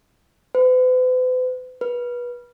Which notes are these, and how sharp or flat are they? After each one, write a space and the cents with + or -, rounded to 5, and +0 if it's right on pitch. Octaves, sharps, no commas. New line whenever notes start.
B4 +45
B4 -25